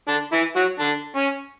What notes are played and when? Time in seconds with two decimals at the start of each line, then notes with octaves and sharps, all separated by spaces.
0.08 D3 D4
0.33 E3 E4
0.56 F#3 F#4
0.79 D3 D4
1.16 C#4